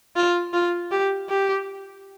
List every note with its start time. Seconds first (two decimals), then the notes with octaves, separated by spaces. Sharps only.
0.16 F4
0.53 F4
0.91 G4
1.29 G4